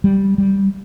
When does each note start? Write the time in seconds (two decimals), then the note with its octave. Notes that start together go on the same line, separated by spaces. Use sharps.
0.04 G3
0.38 G3